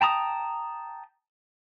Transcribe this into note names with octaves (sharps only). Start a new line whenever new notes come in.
G5 A5 A#5 D#6